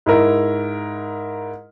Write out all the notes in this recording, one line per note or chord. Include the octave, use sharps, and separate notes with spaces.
G#2 E4 A#4